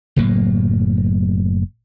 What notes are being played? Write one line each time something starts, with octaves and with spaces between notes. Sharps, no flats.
F#1 A2 F#3 A#3